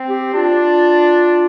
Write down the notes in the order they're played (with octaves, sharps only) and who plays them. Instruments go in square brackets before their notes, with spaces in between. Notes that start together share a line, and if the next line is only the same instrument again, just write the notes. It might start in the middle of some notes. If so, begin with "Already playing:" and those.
Already playing: [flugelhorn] C4
[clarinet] G4
[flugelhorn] D4 [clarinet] F4